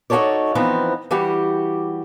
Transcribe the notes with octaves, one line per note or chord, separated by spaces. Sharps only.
D#4 F#4 G4 A4 C#5 D5
E3 F3 B3 C4 D#4
E3 G3 F#4 G4